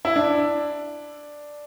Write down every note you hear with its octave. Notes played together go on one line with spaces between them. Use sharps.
E4
D4